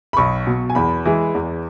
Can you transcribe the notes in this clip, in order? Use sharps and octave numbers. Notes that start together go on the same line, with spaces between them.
B5
B1 C#6
B2 F#3
G#5
E2 B5
E3 G#3
E2